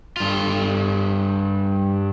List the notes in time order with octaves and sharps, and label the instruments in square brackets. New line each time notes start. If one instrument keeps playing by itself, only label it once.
[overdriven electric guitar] G2 F4